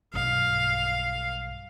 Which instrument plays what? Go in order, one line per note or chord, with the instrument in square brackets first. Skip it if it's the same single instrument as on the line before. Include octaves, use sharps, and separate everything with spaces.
[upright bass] B1 G2 [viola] F5